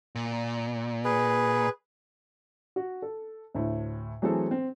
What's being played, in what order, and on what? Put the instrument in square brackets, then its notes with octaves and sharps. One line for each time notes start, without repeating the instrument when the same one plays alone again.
[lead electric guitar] A#2
[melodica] G#4 B4
[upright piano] F#4
A4
D2 A2
E3 F#3 A3 C4 G#4 A4
C4